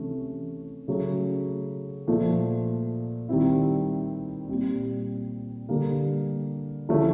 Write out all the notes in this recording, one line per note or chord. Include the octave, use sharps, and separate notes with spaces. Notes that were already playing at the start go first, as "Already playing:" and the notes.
Already playing: C3 E3 A3 C#4
C#3 F#3 A3 C#4
A#2 F3 A3
D#3 G3 C4 E4
A#2 G3 C4
D3 G3 A#3
D3 F3 A3 C#4 E4